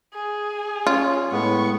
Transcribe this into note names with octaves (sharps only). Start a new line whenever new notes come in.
G#4
C#4 F4
A2 G#3 B3 C#6